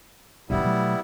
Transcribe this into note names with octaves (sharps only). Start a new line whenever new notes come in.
E1 B1 G2 G3 B3 E4
B2 F#3 A3